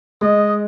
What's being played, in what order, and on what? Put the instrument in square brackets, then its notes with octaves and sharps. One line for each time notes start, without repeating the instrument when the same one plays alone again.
[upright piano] G#3 [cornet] D#5